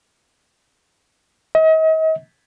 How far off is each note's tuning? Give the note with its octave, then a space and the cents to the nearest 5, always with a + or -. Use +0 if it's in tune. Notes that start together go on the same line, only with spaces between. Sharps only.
D#5 +40